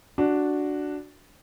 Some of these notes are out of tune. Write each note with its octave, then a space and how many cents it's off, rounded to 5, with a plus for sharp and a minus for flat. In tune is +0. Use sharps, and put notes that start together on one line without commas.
D4 +0 F#4 +0